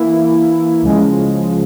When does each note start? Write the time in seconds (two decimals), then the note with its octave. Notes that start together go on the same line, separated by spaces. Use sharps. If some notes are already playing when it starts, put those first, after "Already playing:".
Already playing: E3 A#3 E4
0.82 C#2 C#3 F3 G#3